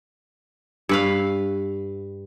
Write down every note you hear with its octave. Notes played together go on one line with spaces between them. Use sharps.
G2 B4 F5